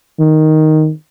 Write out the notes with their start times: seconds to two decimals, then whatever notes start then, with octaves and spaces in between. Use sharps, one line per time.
0.20 D#3